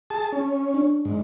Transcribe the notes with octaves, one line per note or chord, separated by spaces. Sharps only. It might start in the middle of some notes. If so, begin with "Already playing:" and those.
G#4 A5
C#4
D4
G#2